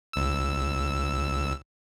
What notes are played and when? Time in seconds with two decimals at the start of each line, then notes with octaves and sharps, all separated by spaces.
0.13 C#2 E6